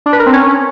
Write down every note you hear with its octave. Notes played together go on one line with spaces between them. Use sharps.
D4
B4
A#4
C4
C#4